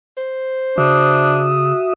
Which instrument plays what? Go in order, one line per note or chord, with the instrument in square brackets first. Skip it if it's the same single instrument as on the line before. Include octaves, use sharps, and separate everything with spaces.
[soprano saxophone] C5
[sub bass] C#3 [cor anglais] D4 [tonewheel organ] F#4 E5 D#6